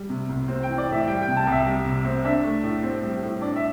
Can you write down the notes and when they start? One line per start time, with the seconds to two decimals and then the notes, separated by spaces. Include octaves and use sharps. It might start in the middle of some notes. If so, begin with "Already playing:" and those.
Already playing: G3
0.09 C3
0.29 C2
0.48 C4
0.63 G5
0.68 E3
0.78 D5
0.88 A2 E5
1.08 G3 G5
1.22 G5
1.27 C3
1.37 A5
1.47 C2 E5
1.66 G3
1.85 C3
2.05 C4
2.24 D4 E5
2.44 A3
2.63 A2
2.83 C4
3.03 G3
3.22 A2
3.41 D4 D5
3.56 E5